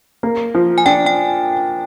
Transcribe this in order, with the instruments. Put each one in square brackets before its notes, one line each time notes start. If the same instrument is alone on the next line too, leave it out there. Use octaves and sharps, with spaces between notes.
[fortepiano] A#3
F3
[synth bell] G#5
[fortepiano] D4 [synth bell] G5
[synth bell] G5